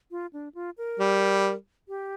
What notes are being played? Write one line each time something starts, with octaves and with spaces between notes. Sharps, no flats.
F4
D4
F4
A#4
G3
G4